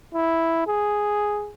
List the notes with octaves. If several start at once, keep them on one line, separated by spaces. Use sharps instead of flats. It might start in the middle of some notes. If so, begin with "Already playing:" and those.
E4
G#4